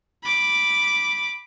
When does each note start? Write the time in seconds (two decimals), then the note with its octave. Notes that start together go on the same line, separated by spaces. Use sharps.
0.23 B5 D6